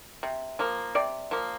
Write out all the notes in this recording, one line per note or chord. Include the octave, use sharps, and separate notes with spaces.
C3
F3 A#3
C3 D5
F3 A#3